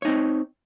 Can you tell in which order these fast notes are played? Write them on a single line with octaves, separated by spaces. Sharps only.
C#5 D#4 C4